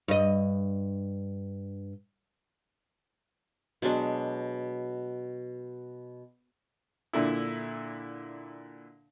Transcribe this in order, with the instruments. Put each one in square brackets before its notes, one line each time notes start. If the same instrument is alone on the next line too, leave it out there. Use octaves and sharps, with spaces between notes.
[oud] G2 D#5
[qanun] B2 F#3 G#3 D4
[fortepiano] A#2 D3 E4